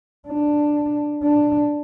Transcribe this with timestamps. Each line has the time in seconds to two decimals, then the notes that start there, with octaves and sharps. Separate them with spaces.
0.28 D4
1.23 D4